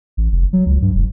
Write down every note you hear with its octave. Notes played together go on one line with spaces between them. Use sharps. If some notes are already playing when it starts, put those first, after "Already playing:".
A1
F1
F#3
C#2
G2
E1